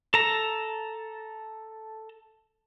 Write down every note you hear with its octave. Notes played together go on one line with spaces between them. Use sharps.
A4 A#5